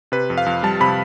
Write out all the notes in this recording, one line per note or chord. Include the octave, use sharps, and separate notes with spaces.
C3 B4
F2
F5
F2
G3 A5
C3 B5